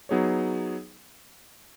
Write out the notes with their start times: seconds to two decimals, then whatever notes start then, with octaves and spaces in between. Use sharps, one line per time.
0.09 F#3 B3 D#4 G#4 C#5